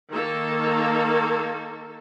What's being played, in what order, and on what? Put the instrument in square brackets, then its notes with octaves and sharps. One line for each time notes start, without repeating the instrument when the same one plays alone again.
[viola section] D#3 A#3 A4